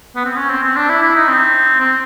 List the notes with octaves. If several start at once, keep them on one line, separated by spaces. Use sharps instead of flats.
B3
C4
C#4
C4
C4
D4
E4
E4
D#4
C4
C4